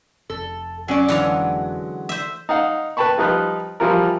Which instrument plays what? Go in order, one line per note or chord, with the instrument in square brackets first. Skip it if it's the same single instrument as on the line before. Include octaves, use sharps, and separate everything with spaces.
[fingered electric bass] F1 [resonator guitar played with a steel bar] A4
[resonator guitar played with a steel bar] F#3 C#4 D5 [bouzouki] G#5
[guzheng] D3 E3 F5 [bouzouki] G#3 B3 F#4
[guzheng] C5 E5
[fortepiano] D#4 F5 F#5
B4 G5 A5 B5 C#6
F3 G3 D#4 F4 B4 F#6
E3 F3 G3 F4 F#4 A#4